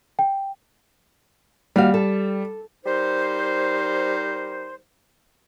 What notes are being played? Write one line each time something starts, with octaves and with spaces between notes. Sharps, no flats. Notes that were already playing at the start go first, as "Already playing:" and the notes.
G5
D#2 G3 F#4 F5
A4
G3 D#4 A#4 C5